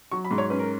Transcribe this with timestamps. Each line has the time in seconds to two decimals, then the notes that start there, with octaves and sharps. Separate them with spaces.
0.12 F#3 C#6
0.25 B5
0.31 G#2
0.38 C#5
0.50 C#4 B4
0.59 A#4